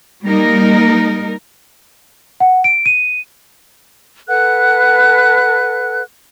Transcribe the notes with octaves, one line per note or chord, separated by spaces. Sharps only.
G3 A#3 D#4 A#4
F#5
D7
D#7
A4 B4 F#5 F#6